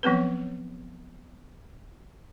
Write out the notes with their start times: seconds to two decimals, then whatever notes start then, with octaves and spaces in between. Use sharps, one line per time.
0.03 F3 F#3 B3 C4 B4